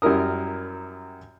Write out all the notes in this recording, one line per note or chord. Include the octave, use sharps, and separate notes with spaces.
F#2 G3 E4 A#4 D#6